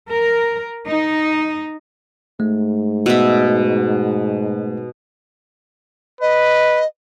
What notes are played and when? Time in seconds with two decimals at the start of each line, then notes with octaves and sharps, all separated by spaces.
0.10 A#4
0.87 D#4
2.40 G#2 A3
3.06 B2 E5
6.21 B4 D#5